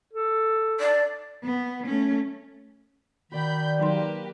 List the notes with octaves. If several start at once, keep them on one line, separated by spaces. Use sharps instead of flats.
A4
D5
B3
A3 C#4
D#3 F#4 D5 B5 G6
F#3 A#3 D#4 G4 B4 C6